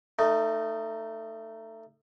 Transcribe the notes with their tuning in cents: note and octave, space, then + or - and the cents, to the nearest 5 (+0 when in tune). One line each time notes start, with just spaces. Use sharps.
A3 +20 D#4 -10